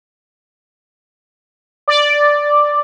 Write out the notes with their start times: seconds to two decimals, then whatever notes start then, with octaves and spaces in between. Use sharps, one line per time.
1.88 D5